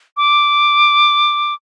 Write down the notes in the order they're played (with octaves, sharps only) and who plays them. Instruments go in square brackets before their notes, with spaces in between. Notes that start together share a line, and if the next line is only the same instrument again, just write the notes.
[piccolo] D6